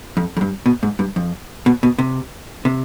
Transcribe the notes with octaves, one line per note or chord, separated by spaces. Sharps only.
F2
F2
G2
B2
G#2
G2
F2
B2
B2
C3
C3